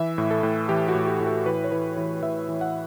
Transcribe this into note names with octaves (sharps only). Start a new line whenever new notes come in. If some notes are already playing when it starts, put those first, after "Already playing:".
Already playing: E3 E5
A2
A4
A2
E3 G4
F#4
A2
G4
A2
A4
E3 B4
C#5
E3 B4
E3
E3 E5
E3
F#5